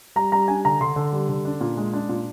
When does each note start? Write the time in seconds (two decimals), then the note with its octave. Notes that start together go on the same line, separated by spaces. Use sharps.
0.16 G3 A#5
0.32 G3 A#5
0.48 D4 G#5
0.65 D3 A#5
0.81 D3 C6
0.96 D3
1.13 G3
1.29 D3
1.45 D4
1.61 A#2
1.77 G#3
1.93 D4
2.09 A#2